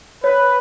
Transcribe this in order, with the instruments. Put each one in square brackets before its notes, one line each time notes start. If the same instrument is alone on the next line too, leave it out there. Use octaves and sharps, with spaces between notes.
[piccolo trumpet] B4 [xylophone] C#5